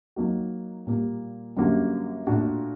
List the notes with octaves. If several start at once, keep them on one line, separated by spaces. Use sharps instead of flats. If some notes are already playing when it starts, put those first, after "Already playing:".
F#3 A#3 D#4 F#4
A#2 G3 A#3
F#2 D3 G3 A#3 F#4
A#2 A3 D4 F#4